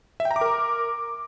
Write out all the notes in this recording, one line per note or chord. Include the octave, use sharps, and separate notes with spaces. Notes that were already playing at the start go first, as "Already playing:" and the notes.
E5
G5
A#5
D6
A#4